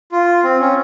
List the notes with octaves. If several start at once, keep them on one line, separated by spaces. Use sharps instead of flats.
F4
C4
C#4